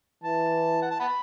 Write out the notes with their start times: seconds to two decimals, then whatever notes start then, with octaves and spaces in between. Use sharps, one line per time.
0.23 E3 A5
0.82 F#5
0.91 A5
1.00 F#5 B5